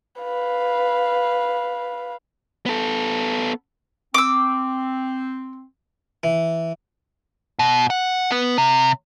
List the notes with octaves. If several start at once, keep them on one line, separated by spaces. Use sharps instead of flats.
B4 F5
B3 A4
C4 D6 E6
E3
B2
F#5
B3
C3